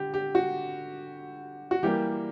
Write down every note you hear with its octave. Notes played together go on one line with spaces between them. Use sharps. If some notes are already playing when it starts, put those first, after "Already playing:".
Already playing: D3 G4
G4
F#4
F#4
E3 G3 A#3 G4